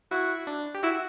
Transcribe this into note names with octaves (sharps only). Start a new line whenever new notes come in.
E4 F#4
D4
G4
E4 F#4